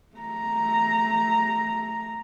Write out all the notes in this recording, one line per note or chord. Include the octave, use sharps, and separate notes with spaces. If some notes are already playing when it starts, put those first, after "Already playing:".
A3 A#5